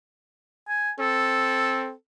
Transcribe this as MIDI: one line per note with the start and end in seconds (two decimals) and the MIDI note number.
0.68 0.91 80
0.99 1.93 60
0.99 1.93 69